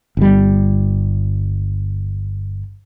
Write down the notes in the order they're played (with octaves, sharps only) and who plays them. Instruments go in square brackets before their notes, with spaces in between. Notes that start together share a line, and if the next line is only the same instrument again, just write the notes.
[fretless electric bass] G1 G3